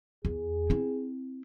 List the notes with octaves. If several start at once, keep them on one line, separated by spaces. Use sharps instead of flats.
E2 G#4
C4 E4